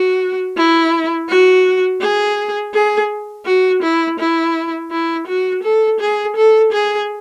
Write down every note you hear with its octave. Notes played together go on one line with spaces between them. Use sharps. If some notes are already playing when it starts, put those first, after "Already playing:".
Already playing: F#4
E4
F#4
G#4
G#4
F#4
E4
E4
E4
F#4
A4
G#4
A4
G#4